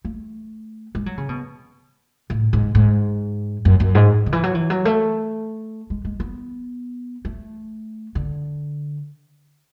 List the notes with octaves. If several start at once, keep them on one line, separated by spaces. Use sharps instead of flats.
A3
G#3
F#3
C#3
B2
A2
G#2
G#2
F#2
F#2
G#2
D3
E3
F#3
E3
F#3
A3
G#3
G#3
B3
A3
D3